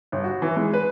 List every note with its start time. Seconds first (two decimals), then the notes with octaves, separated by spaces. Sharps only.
0.12 G1
0.24 F#4
0.42 E3
0.56 G#3
0.74 B4